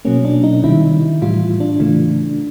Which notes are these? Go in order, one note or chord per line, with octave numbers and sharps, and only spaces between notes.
B2 F#3 A#3 C#4
D4
D#4
C3 D#3 G3 E4
A2 E3 G3 F4
D4
C#3 E3 A3